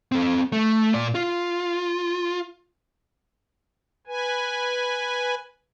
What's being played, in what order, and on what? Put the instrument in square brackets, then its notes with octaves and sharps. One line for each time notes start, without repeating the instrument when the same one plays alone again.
[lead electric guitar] C4 A4
A3
A#2 D5
F4
[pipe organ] B4 G#5